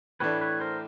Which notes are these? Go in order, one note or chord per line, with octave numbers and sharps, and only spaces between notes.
A2 E3 A3 D4 B4 C#5
B4 C#5
A#4 C5